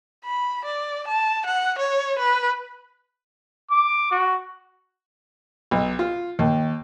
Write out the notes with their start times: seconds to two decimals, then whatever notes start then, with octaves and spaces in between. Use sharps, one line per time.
0.24 B5
0.65 D5
1.07 A5
1.46 F#5
1.78 C#5
2.18 B4
3.71 D6
4.11 F#4
5.71 B1
5.99 F4
6.39 D#2